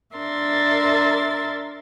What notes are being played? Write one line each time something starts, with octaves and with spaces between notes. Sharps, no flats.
D4 A#4 E5 C6 A6